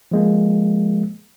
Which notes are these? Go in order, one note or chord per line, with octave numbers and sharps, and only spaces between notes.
F3 G#3 A#3